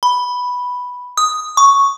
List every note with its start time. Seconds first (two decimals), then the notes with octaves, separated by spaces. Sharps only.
0.03 B5
1.17 D#6
1.57 C#6